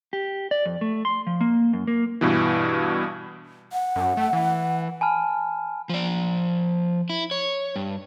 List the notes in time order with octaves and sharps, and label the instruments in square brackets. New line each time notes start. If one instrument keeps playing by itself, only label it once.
[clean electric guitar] G4
D5
F2
A3
C6
F3
A#3
F#2
A#3
[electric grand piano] G2 B2 E3
[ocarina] F#5
[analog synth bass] F#2
A3
E3
[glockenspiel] G#5 A5 B5 F6
[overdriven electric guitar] F3 D5
E4
C#5
G2